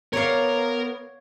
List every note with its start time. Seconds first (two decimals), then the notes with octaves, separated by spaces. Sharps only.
0.13 B3 A#4 C#5 D5 F5